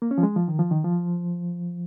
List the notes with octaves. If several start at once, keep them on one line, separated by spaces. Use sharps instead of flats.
A#3
C#4
F3
G#3
F3
D#3
F3
D#3
F3